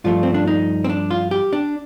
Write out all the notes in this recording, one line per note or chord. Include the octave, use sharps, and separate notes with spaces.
G2 F3 A3 F4
C4
D4
D#4
C4
D4
F4
G4
D4